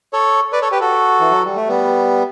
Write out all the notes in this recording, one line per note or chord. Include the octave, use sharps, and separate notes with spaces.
A4 C#5
B4 D5
A4 C#5
G4 B4
F#4 A4
E3
F#3
G3
A3
G3 B3